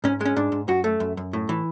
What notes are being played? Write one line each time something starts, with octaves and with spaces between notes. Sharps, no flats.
G#2 C#4
G#3 C#4
G#2 D4
G#2
F#2 F#4
A3
F#2
F#2
A2
E3